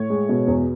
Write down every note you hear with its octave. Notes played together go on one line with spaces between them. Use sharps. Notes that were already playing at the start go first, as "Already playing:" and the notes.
Already playing: A2 C#5
G#3
B2
E2